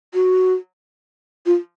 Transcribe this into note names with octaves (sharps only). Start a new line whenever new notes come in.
F#4
F4